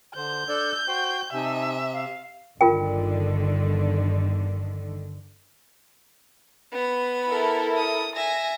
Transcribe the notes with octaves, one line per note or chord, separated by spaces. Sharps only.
D3 C5 G6
D4 A4 D5 E6
F#4 C5 G5
C3 D#4 E5 G#5 A5
F5
G1 D3 D#3 F4 A#4 G5
B3 B5
E4 A4 A#4
D#6
E5 G#5 A#6